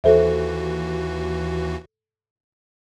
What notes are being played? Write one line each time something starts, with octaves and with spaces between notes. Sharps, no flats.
D#2 E3 F#4 A4 C5 E5